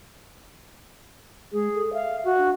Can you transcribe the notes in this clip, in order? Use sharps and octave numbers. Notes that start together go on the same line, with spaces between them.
G#3 G#4
A4
E5 F5
F#4
D4